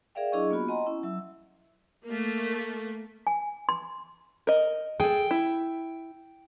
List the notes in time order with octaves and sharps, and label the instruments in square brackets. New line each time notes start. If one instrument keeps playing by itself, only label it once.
[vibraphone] G#4 A#4 D5 E5 F5 G5
F#3 D4 E4 G#4 D#5 C#6
A#3 B3 F4 F#4 B5
D#5 F#5 G#5 A#5 C6
C#4 E4
F#3 E5 E6
[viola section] A3 A#3
[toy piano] G#5
C6
[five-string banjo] A#4 D#5
[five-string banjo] G#4 A4 [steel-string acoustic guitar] G5
[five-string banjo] E4